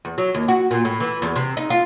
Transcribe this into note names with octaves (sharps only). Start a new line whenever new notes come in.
E2
F#3
D#2
F#4
A#2
A2
E3
E2
C3
D#4
F4